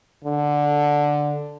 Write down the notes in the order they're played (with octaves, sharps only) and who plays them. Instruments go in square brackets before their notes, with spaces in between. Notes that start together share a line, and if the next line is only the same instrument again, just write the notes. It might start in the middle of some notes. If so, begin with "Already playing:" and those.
[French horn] D3